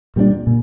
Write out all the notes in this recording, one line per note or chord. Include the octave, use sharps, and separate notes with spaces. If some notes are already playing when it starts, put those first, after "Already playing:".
A#2 G3 B3 D4
A#2